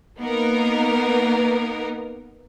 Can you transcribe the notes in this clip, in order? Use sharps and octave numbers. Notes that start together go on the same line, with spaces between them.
A#3 B3 D#4 A#4